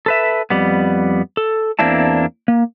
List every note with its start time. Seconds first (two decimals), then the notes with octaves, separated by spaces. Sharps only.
0.06 A4 B4 E5
0.50 F2 G3 B3
1.37 A4
1.79 E2 A#3 C4 D4 E4 A5
2.48 A#3